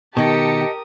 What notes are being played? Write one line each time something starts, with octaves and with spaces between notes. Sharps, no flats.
B2 D#3 G4 A#4 D#5 A5 D#6 C#7